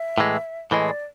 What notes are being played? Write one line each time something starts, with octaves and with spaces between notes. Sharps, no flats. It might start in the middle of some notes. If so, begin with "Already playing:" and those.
Already playing: E5
A2 E3 G#3
A2 E3 G#3 D#5
D5